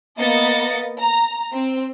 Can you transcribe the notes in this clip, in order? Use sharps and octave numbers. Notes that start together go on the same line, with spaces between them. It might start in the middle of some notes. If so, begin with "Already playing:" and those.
A#3 B3 D#5 A6 A#6 C#7
A#5
C4